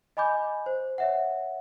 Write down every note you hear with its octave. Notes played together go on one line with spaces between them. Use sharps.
D#5 G#5 B5 D6 G6
C5
C#5 E5 F#5